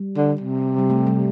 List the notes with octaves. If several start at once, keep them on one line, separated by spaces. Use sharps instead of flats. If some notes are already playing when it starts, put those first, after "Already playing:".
Already playing: G3
D3
C3
G3
A3
G3